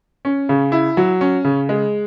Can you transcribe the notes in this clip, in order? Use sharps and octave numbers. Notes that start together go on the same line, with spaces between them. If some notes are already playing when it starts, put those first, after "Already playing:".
C#4
C#3
E4
F#3
C#4
C#3
G#3